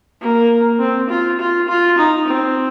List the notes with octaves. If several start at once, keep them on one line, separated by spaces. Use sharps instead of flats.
A#3
C4
F4
F4
F4
D#4
C4